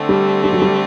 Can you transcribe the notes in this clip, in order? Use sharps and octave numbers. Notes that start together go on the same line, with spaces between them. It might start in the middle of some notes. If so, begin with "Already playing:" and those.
Already playing: D3 A3 C4
G3
G3
F#3
G3